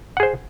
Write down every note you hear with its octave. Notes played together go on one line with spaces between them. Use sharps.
G#4 C5 F#5